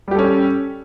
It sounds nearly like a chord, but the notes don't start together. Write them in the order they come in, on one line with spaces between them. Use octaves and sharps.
G3 G4 A4 C#4